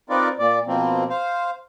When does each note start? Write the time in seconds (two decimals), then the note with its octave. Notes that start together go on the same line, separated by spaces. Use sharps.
0.10 C4 D#4 F4 A#4 B4 D5
0.39 A#2 D5
0.67 B2 F3 A#3 C4
1.10 C5 F5